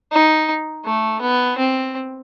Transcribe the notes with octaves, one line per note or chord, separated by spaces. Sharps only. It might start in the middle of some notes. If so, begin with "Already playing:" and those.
D#4
A3
B3
C4